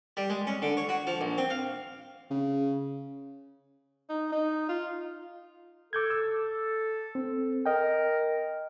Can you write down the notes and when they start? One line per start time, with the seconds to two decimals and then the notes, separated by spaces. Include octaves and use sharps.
0.17 G3
0.30 G#3
0.47 C#4
0.62 D3
0.77 C#5
0.89 F#4
1.07 F3
1.21 A#1
1.38 C4
1.50 F5
2.30 C#3
4.10 D#4
4.32 D#4
4.69 F4
5.93 A4 D6 G6 G#6
6.10 E6
7.15 C4
7.66 A#4 D#5 G5